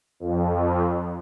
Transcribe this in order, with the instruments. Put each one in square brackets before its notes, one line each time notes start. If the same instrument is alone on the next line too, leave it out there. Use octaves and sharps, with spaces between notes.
[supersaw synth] F2